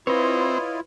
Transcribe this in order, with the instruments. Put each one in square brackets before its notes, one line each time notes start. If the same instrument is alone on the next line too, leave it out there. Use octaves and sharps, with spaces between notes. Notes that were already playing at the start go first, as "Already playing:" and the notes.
[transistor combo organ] C4 [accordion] E4 F4 [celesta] B4 B5 [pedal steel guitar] C#5 D#5